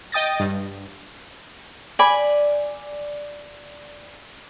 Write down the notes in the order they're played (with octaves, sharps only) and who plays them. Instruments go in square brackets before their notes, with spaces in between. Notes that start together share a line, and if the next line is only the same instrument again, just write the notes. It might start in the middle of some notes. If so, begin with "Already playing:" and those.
[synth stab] D#5 G5 D#6 A6 A#6
G2
[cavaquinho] D5 G#5 B5